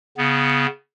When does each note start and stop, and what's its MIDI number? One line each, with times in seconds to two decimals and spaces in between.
0.17 0.67 49
0.17 0.67 59